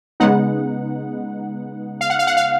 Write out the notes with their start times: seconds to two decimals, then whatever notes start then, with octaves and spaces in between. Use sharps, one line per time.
0.20 C#3 G#3 B3 D#4 F#5
2.01 F5
2.10 F#5
2.19 F5
2.27 F#5
2.37 F5